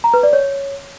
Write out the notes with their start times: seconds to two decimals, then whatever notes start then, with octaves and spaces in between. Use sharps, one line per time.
0.04 A#5
0.14 B4
0.23 D5
0.33 C#5